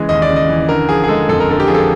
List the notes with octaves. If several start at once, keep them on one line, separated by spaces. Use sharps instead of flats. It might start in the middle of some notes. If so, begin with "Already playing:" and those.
Already playing: C#3 E3 G#3
D#2 D#5
D5
C#3
D#5
E3
D3 A#4
F3 G#4
G#4
G#3 A4
F2 A4
A#4
D3 A4
G4
F3 G#4
A4